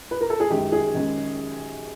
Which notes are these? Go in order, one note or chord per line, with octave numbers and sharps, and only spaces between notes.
B4
A#4
A4
G#4
F#2 D#3 G#3 C#4 G4
G#4
D#3 G#3 C#4